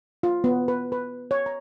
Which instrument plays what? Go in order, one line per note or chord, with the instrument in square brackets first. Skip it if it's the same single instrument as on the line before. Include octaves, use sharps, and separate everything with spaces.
[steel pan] F4
B3
B4
B4
C#5
A#5